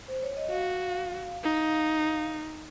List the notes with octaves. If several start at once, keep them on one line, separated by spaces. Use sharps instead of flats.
C5
C#5
D#5
F#4 F5
D#4 F5